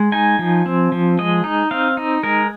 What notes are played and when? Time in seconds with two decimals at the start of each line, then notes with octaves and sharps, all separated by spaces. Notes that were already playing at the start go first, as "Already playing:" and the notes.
Already playing: G#3
0.12 D#4 G#5
0.39 F3
0.66 C4
0.92 F3
1.19 G#3 D#5
1.44 D#4
1.71 C4 F5
1.97 D#4
2.23 G#3 A#4